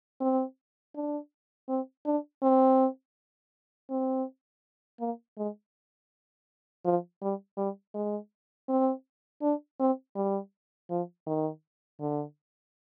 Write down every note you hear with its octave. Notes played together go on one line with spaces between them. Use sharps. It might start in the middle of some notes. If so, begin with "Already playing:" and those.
C4
D4
C4
D4
C4
C4
A#3
G#3
F3
G3
G3
G#3
C4
D4
C4
G3
F3
D#3
D3